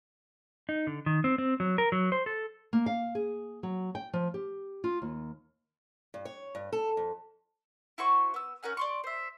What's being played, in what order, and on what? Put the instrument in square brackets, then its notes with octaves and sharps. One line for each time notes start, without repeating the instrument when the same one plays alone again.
[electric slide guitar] D#4
D3
D#3
C4
C4
F#3
A#4
F#3
C5
A4
[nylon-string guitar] A#3
F5
G#4
F#3
G5
F3
G4
F4
D#2
[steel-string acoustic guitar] G2
C#5
G2
A4
F2
[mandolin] E4 F#4 C5 C#6
B3 E6
C#4 A#4 F#5 G#5
D5 C6 C#6
C5 E5